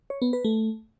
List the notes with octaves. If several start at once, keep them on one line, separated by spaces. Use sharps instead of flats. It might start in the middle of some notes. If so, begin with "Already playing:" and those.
C#5
B3
B4
A3